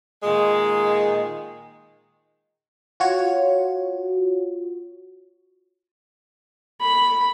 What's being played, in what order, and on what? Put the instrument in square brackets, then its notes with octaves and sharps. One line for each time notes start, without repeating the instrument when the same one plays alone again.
[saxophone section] A#2 D#3 G#3
[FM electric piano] F4 F#4 C#5
[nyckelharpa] B5